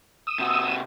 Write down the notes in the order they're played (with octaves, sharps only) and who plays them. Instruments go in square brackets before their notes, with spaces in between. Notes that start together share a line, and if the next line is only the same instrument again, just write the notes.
[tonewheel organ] D#6 E6
[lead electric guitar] C3 F#4